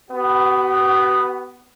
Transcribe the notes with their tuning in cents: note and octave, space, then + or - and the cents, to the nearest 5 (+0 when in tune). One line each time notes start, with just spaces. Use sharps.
B3 +5 F#4 +45